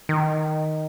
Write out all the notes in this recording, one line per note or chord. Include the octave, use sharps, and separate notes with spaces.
D#3